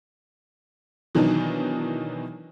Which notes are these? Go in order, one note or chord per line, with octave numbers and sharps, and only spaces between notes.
B2 D#3 E3 F#3 D4 D#4